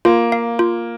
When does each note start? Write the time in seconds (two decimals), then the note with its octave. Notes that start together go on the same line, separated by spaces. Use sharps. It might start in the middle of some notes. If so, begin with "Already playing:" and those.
0.05 A#3 F4
0.32 F5
0.59 F4